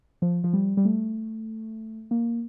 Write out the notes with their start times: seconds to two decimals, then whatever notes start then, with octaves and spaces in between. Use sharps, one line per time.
0.22 F3
0.44 F3
0.53 G3
0.77 G3
0.85 A3
2.11 A#3